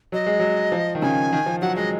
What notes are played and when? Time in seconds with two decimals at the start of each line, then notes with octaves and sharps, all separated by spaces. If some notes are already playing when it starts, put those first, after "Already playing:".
0.12 F#3 D#5
0.27 G#3
0.40 F#3
0.72 F3
0.95 D#3
1.02 C#3 G#5
1.33 D#3
1.46 F3
1.62 F#3 F#5
1.76 G#3 D#5